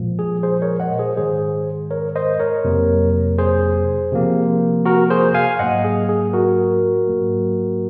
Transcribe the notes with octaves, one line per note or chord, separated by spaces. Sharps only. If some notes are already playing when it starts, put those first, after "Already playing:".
Already playing: A#2 F3 G#3
G#4
G#4 C5
A#4 C#5
D#5 F#5
G#4 C5
G#2 D#3 G#3 G#4 C5
A#4 C#5
C5 D#5
A#4 C#5
F2 C3 F#3 A#3
G#4 C5
C3 F3 A#3
F#4 A#4
G#4 C5
F5 G#5
G#2 F#3 A#3 D#5 F#5
G#4
G#4
F#4 A#4
G#2 F#3 A#3